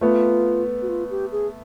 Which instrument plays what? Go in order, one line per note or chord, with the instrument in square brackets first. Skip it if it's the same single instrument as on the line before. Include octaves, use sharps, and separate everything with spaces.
[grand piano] A3 B3 [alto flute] F4
[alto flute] F#4
F4
G4
G#4